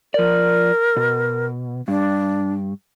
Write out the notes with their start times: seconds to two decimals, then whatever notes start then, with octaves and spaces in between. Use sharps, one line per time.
0.14 F3 A#4 D5
0.97 B2
1.88 G2 D4